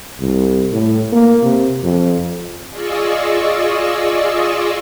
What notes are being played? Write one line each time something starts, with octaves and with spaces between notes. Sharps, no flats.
C2
A2
A#3
C3
F2
F4 G#4 D5 D#5 C#6 E6